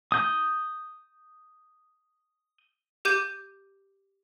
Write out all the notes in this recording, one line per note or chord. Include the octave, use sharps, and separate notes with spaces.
D#6 G6
G4 D6 G6 D#7